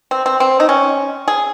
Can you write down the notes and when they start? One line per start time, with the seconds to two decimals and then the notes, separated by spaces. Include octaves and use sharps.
0.11 C4
0.26 C4
0.40 C4
0.60 D#4
0.69 C#4
1.28 G#4